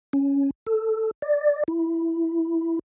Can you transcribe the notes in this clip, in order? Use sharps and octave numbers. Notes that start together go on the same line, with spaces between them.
C#4
A4
D5
E4